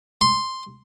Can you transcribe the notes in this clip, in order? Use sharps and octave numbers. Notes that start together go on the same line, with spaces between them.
C6